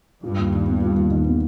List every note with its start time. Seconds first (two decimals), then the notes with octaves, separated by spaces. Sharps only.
0.24 G2 F4
0.38 D#2
0.53 D#3
0.67 B3
0.82 F4
0.97 D#2
1.11 D#3
1.26 B3